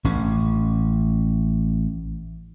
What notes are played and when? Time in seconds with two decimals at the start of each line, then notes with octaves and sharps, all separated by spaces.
0.04 A1 C#4